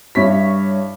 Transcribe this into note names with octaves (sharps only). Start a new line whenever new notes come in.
G2 E4 C#5 B6